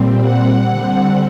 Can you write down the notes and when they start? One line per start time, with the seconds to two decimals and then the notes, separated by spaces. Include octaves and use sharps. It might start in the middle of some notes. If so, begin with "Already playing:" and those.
Already playing: A#2 G3 C4
0.21 F#5
0.70 D3 G3 C4